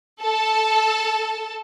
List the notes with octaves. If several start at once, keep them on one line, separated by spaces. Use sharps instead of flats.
A4 A5